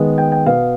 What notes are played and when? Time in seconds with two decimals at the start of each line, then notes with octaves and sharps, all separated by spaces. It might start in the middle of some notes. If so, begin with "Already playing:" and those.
Already playing: D#3 G#3 B3
0.18 G5
0.32 G5
0.46 B2 B3 F5